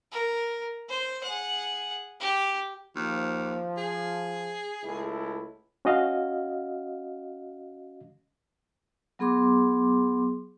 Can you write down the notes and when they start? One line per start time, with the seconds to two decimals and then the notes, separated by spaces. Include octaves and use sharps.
0.12 A#4
0.89 C5
1.23 G#4 F#5
2.20 G4
2.96 D#2 F3
3.77 G#4
4.83 C#2 A3 E4
5.85 C#4 F#4 D#5 F5
9.19 F#3 B3 G#4 C6 D6